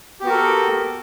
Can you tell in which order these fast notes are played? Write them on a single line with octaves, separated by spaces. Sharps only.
G4 B3 F#4 A#4 A4